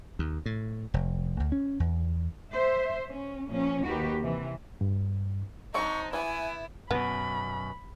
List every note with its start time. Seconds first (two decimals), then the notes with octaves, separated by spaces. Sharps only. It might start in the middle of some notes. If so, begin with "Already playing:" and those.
0.19 D#2
0.46 A2
0.94 F1
1.40 D2
1.52 C#4
1.80 E2
2.51 C5 E5
3.09 C#4
3.49 A#2 F3 C#4
3.84 D#2 D#3 F#4 G4 B4
4.21 C3 E3
4.81 G2
5.74 F#3 C4 D4 D#4 C#6
6.13 E3 B3 E4 G#5
6.91 F#2 B2 B3 B5